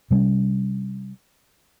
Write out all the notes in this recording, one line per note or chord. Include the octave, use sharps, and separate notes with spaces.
C3 G3 A#3 C#4